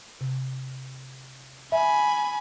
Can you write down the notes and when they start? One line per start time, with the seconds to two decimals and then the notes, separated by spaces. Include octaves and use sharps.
0.21 C3
1.72 E5 G#5 B5